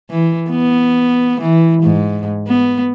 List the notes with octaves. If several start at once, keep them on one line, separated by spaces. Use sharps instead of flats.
E3
B3
E3
G#2
B3